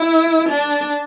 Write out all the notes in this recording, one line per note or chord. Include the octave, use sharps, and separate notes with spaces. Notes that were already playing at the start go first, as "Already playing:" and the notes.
Already playing: E4
D4